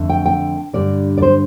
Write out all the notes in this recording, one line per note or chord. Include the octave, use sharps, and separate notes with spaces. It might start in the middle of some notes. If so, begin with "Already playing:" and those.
Already playing: F2 D3 A3
G5
G5
G2 D3 G3 D5
D5
C5